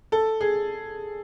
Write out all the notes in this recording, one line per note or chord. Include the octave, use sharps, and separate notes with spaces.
A4
G#4